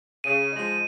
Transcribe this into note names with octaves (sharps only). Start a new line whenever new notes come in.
C#3 D#7
F3 G#3 D#4